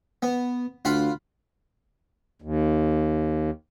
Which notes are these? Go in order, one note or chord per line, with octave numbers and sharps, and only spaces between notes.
B3
D2 F4 F#5 B5
D#2